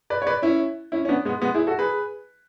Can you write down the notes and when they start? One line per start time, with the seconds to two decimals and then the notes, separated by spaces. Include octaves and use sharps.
0.10 B4 D5
0.22 C#5
0.27 B4 D5
0.42 C#4 E4
0.92 C#4 E4
1.05 C#4
1.08 B3 D4
1.25 G#3 B3
1.42 G#3 B3
1.54 E4 G#4
1.67 F#4 A4
1.79 G#4 B4